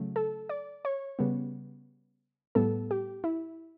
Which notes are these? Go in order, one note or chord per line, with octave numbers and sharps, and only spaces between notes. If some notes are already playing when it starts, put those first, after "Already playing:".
Already playing: C#3 F#3 A3
A4
D5
C#5
C#3 G3 B3
A2 G3 B3 A4
G4
E4